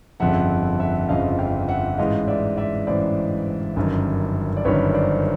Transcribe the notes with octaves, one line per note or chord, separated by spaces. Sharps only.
G1 F2 C#3 F3 E5 F#5
E5 F#5
G1 F2 C#3 F3 D#5 F5
F5 G5
E5 F#5
A1 G#2 E3 D#5 F5
D5 E5
D5 E5
A1 G#2 E3 C5 D5
G1 F#2 D#3
D5
G1 F#2 D#3 B4 C#5
C5 D5